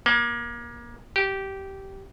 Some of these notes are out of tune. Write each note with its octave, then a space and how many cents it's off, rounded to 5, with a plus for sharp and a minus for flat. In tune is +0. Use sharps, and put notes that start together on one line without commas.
A#3 +30
G4 -15